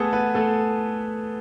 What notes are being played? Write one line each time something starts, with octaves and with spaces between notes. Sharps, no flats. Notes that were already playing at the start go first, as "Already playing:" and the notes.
Already playing: A3 B3 G#4 A4 B4
B3 B4
A3 A4